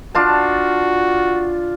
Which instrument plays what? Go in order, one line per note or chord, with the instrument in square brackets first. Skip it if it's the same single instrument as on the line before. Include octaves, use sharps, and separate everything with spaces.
[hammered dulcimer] D4 F4 A5 [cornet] F#4